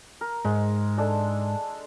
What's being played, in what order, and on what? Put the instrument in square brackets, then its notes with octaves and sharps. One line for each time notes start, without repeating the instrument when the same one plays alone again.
[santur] A#4
[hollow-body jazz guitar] G#2 [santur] G#3
[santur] G#3 D4 A4